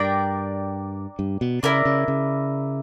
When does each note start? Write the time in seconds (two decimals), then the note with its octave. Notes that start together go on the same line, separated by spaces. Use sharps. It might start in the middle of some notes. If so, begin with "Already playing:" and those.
Already playing: G2 D4 A#4 D5 G5
1.19 G2
1.41 B2
1.63 C#3 E4 A#4 D5
1.85 C#3
2.08 C#3